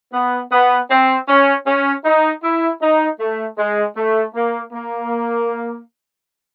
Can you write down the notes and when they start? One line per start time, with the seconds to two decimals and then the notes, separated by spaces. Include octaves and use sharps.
0.13 B3
0.52 B3
0.90 C4
1.28 C#4
1.67 C#4
2.05 D#4
2.43 E4
2.82 D#4
3.20 A3
3.58 G#3
3.96 A3
4.35 A#3
4.73 A#3